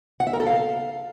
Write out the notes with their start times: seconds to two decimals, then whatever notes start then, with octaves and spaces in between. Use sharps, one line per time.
0.20 F#5
0.27 E5
0.33 A#4
0.40 A4
0.47 F5